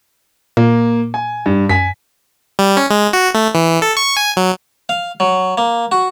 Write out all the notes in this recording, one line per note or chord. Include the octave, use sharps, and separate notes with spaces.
A#2 A#3
G#5
G2
F#2 G#5 B6
G3
C#4
G#3
F#4
A3
E3
A4
C#6
G#5
F#3
F5
F#3
A#3
F#4